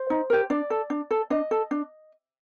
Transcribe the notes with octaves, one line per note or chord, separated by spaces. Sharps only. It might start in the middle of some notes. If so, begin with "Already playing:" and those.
Already playing: C5
D#4
G4 A#4
D4 D5
A4
D4
A4
D4 D#5
A4
D4